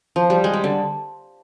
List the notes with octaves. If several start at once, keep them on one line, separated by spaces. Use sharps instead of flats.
F3
G3
G#3
G3
D3